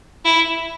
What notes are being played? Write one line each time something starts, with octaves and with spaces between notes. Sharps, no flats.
E4